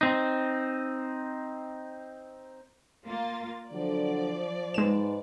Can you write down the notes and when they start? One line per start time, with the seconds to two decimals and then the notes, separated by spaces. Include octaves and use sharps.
0.01 C4 D#4
3.05 A#3 F4 A6
3.72 D3 F3 F#3 D5
4.74 G#2 G#3 B4 E7